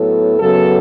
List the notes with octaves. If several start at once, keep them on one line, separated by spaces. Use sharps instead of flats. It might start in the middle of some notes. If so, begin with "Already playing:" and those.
Already playing: A2 F#3 B3 A4
F#2 C#3 F#3 B3 A4